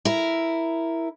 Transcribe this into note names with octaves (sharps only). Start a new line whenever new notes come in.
E4 A#4